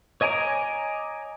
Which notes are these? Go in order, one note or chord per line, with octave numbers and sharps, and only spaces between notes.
C#5 D#5 G#5 A#5 D6